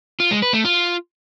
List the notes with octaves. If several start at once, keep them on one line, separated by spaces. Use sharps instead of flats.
F4
G#3
B4
A3
F4